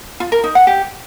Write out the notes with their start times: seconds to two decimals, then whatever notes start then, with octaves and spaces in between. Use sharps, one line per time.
0.20 F4
0.32 A#4
0.44 D#4
0.55 F#5
0.67 G4